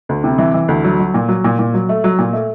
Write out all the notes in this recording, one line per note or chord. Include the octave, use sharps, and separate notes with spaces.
D2
C3
E3
E3
D2
F#3
F#3
A#2
F#3
A#2
A#2
F#3
A3
F#3
A#2
A3